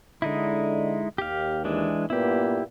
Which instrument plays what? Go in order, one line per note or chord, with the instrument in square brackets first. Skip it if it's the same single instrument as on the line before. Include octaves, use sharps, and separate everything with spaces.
[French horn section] D3 [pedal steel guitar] G#3 D#4 E4
[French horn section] D#2 [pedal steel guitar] G4 F5
[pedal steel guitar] E3 G#3 D4
[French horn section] G2 A#2 B3 [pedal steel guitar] E4 G4